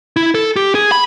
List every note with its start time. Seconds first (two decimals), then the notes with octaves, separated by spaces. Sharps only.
0.16 E4
0.35 A4
0.56 G4
0.75 G#4
0.92 B5